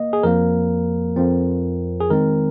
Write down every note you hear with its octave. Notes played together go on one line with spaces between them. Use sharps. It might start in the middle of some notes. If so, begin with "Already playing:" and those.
Already playing: A#3 D#5
G#4
F2 F3 A#3 A#4
F2 F3 C4
G#4
D#3 G#3 C4 A#4